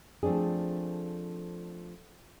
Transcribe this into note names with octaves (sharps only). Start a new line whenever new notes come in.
F3 A3 C4 D4 G#4